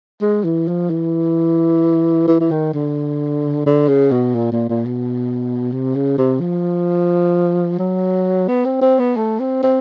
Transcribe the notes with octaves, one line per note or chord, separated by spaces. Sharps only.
G#3
E3
F3
E3
E3
E3
D#3
D3
D3
C#3
B2
A#2
A#2
A#2
B2
C3
C#3
C3
F3
F#3
B3
C4
C4
B3
A3
C4
C4